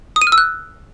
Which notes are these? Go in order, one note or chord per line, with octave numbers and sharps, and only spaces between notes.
D#6
D#7
F6
E6
F#6